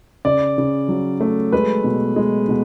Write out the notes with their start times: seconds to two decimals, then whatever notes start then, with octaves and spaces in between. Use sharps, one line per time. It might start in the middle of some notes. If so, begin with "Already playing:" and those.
0.25 C#3 D5
0.58 C#3
0.88 F#3
1.20 A3
1.52 G#3 B4
1.84 B2
2.16 G#3
2.49 B2